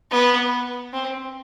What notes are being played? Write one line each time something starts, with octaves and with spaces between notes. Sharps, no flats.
B3
C4